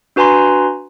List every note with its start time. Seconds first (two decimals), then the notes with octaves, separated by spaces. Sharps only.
0.16 D4 F#4 B4 G#5 A#5 C6